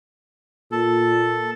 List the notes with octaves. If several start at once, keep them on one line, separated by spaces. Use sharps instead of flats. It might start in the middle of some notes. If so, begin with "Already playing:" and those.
A#2 A4